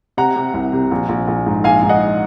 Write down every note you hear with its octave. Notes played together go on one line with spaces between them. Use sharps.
C3 F#5 A#5
C3
C2
C3
A#1
A#1
A#1
G#2
A#1 F5 G#5
G#2
D#5 F#5